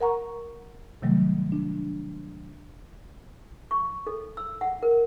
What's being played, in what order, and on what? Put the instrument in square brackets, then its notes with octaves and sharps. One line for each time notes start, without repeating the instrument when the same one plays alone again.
[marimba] A#4 F#5 A#5 C#6
C3 D#3 F#3 G3 A3
D4
[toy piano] C#6
A4
E6
F#5
A#4